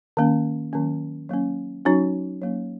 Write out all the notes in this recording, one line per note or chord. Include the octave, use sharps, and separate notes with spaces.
D#3 A#3 C#4
D#3 F#3 A#3 C#4
F#3 A#3 C#4
F#3 C#4 D#4 F#4
F#3 A#3 C#4